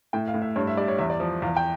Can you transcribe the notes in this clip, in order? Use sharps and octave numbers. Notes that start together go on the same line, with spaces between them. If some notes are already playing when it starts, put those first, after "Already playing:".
A2 G5
F5
A2
E5
G2 C#5
E5
G3 D5
C#5
E2 E5
D5
F3
E2 F5
G5